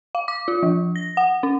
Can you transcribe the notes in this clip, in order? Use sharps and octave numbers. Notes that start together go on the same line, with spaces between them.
F5
D6
F4
F3
A#6
F#5
C#4